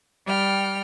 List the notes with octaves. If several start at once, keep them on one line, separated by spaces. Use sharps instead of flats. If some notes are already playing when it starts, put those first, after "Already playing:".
G3 G5 F6